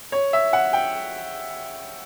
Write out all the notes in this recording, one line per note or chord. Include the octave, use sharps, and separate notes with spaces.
C#5
E5
F#5
G5